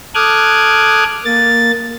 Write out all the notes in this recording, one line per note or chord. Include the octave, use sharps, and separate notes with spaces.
A4 D6 D#6 F6 F#6 G#6
A#3 A6